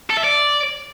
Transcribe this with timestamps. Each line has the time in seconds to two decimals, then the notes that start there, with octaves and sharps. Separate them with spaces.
0.10 A4
0.17 E5
0.24 D5